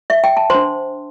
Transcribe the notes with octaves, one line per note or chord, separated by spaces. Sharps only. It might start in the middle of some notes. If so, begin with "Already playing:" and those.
E5
G5
A5
D4 C5 C6